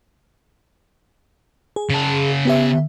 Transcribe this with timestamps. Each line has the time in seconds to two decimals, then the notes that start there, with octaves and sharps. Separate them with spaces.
1.76 G#4
1.90 C#3 A5
2.45 B3 G4 E5